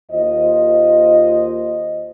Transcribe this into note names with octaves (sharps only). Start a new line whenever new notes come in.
D#2 F4 C5 D#5